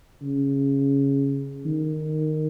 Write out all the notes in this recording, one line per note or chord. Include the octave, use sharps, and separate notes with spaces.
C#3
D#3